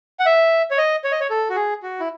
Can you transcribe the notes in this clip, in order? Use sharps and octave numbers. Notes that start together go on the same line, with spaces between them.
F#5
E5
C#5
D#5
C#5
D#5
C#5
A4
F#4
G#4
F#4
E4